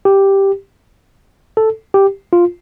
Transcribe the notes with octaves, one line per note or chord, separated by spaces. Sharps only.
G4
A4
G4
F4